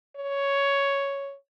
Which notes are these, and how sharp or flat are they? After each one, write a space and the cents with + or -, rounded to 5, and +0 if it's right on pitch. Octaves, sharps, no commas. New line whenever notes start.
C#5 +5